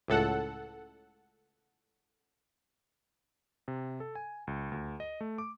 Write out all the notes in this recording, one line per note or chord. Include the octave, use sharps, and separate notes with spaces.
C#2 A2 A4 F#5
C3
A4
G#5
C#2
D2
D#5
A3
D6